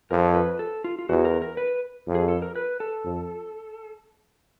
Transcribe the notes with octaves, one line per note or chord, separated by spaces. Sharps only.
F2 A#4
B4
A4
F4
F4
E2 F#4
A#4
A#4
B4
F2
G#4
A4
A#4
B4
A4
F2